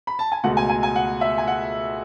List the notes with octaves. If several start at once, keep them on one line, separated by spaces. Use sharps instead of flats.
B5
A5
G#5
C#2 B2 A3 F#5
G#5
G#5
G#5
F#5
E5
G#5
F#5